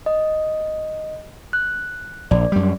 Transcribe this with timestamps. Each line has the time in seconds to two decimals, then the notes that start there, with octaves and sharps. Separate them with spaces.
0.06 D#5
1.53 F#6
2.31 A#1 D5
2.52 F#2 G3